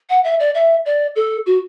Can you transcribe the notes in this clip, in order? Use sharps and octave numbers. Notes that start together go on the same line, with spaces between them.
F#5
E5
D5
E5
D5
A4
F#4